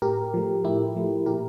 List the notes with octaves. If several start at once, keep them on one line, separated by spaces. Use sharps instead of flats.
A2 G4 A#4
F3 A3
A2 E4 G4
F3 A3
A#2 G4 A#4